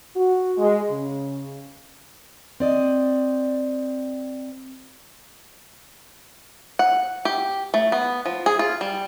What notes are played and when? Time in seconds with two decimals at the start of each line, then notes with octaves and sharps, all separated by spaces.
0.16 F#4
0.57 G#3
0.90 C#3
2.60 C4 D5 D#5
6.79 F#5
7.25 G4
7.74 A3
7.92 B3
8.26 F3
8.46 G#4
8.59 F4
8.81 G3